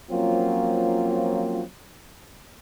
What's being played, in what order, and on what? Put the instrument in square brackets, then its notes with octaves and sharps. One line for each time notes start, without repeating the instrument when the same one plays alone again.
[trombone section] F3 F#3 A#3 C4 C#4 F4